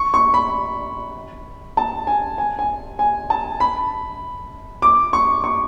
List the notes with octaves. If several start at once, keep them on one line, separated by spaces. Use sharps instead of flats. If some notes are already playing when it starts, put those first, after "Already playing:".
Already playing: C#6
C#6
B5
A5
G#5
G#5
G#5
G#5
A5
B5
D6
C#6
C#6